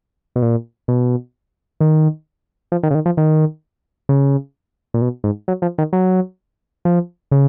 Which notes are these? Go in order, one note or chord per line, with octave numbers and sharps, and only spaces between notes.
B2
A#2
B2
D#3
F3
D#3
C#3
D#3
F3
D#3
C#3
A#2
B2
G#2
F#3
F3
D#3
F#3
F3
C#3